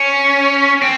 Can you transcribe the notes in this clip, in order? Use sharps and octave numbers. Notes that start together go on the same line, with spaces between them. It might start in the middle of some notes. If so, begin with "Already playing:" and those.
Already playing: C#4
C4